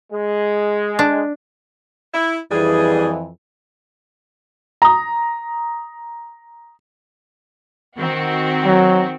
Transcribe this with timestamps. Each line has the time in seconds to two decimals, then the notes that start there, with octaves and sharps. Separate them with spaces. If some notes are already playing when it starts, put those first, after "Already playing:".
0.12 G#3
0.99 D4
2.13 E4
2.51 F2 E3 G3 D4 G#4
4.82 A#5 D#6
7.98 D#3 C4 F#4
8.65 F#3